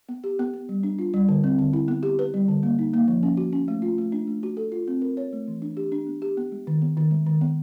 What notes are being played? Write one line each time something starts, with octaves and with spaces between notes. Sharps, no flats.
B3
G4
B3
B3
G3
D4
F4
G3
D3
C4
D3
E4
B3
G4
B4
G3
D3
A#3
D#4
A#3
F3
C#4
F#4
C#4
A3
F4
A3
D4
A3
F#4
A4
F4
C4
A#4
C#5
A3
E3
D4
G4
D4
B3
G4
B3
G#3
D#3
B3
D#3
G#3
D#3
B3